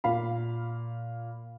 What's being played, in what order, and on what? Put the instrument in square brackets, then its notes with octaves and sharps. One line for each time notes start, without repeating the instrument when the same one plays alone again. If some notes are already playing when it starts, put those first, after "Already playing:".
[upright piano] A#2 F5 B5